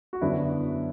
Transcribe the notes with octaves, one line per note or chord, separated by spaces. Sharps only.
F#4
F#2 D3 B3 D4 E4